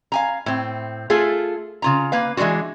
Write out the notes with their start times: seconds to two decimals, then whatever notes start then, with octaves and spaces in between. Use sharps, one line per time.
0.12 F5 G#5 A#5
0.46 A2 C4
1.10 A3 F4 G#4 A4
1.82 C#3 F4 A#5
2.12 A#3 B4 F5
2.37 E3 G#3 D4 F4 F#4